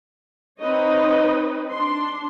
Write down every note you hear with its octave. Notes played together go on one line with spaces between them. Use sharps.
C4 D#4 B4 C#5 D#5
D4 C6